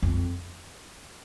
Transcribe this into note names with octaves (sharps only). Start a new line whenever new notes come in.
F2